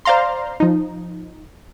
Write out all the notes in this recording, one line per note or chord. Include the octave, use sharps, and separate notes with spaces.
C5 D5 F5 A#5 C6
F3 D#4